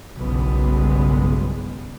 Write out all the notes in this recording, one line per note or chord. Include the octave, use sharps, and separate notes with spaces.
F#1 B1 G2 G#3 B3